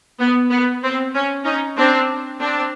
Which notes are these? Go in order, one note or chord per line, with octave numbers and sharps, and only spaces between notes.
B3
B3
C4
C#4
C#4 D#4
C4 D4
C4 D4